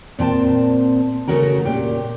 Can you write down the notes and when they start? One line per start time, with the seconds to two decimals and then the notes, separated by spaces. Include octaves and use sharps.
0.19 A#2 C4 G#5 A5
1.28 C#3 A3 C#4 F#4 A#4
1.65 A#2 G4